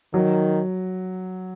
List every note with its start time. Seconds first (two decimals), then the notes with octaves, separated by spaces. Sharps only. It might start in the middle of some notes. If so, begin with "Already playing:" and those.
0.14 D#3 F#3